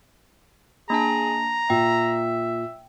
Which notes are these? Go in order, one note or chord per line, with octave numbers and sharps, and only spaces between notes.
A#3 D4 G#4 A5 A#5
A#2 E5 G5